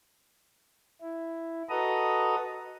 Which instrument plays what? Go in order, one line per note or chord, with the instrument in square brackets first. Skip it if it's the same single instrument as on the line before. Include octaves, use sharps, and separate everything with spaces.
[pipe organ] E4
F#4 A4 B4 D#5 A#5 D#6